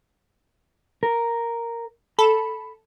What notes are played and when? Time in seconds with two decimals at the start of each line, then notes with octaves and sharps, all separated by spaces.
1.03 A#4
2.19 A4 B5